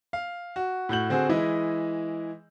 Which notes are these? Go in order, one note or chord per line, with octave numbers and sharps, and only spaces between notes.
F5
F#4
A2 F#4 G6 F#7
D3 C4 F#4 G#4 C5
E3 G#3 E4 D#5